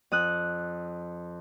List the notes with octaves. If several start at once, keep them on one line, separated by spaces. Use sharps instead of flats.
F2 D#6 F#6